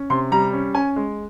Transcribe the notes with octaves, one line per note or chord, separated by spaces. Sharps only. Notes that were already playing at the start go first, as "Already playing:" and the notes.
Already playing: C#4
C3 C6
G3 A#5
C#4
C#4 G#5
G#3